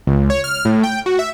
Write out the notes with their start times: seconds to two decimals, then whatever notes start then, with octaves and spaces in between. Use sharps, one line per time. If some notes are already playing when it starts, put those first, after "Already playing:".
0.07 C#2
0.30 C#5
0.44 F6
0.65 A2
0.83 G5
1.06 F#4
1.19 E5